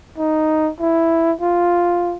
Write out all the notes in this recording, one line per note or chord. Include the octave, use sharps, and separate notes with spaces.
D#4
E4
F4